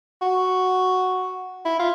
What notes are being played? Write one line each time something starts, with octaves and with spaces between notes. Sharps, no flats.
F#4
E4
F4